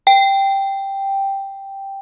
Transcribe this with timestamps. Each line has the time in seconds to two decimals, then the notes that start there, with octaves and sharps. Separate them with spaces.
0.07 G5